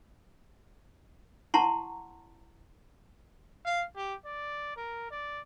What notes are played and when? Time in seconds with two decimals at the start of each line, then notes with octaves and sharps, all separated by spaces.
1.54 E4 F#5 A5 A#5 C6 C#6
3.65 F5
3.96 G4
4.26 D5
4.76 A#4
5.11 D5